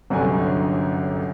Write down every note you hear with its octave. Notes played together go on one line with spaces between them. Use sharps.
G1 C2 F#2 D3 C#4 G#5